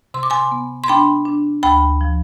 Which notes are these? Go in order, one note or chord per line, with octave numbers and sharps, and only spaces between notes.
C3 C6
D6
G#5 C6
B3
C6
D4 G5 B5
D4
D2 G5 B5
F3